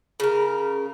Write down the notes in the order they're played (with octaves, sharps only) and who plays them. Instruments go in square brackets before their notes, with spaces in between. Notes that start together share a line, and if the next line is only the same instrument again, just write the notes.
[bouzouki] C#3 A#4